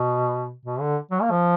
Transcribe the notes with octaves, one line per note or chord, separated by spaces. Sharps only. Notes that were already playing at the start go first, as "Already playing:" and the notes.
Already playing: B2
B2
D3
F#3
A#3
F3